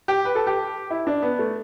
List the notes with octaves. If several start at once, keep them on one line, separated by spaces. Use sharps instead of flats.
G4
B4
A4
G4
E4
D4
B3
A3